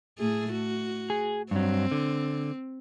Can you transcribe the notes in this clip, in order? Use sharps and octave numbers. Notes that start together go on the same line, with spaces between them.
A2 A3 G#4
F#4
G#4
G2 F#3 C4
D3